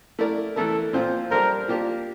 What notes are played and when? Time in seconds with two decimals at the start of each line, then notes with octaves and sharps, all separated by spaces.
0.19 A3 E4 A#4 D5
0.56 E3 A3 E4 A4 A#4
0.93 A#2 F3 C4 F4 C5
1.31 G3 D4 A4 A#4 C5
1.68 F3 A#3 D4 G4